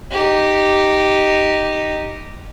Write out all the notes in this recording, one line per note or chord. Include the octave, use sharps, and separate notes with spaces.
D#4 G4